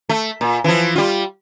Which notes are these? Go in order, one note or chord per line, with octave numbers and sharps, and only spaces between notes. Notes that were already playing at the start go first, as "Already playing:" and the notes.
A3
A#2
E3 F3
G3 F4